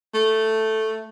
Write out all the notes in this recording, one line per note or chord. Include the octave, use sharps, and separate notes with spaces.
A3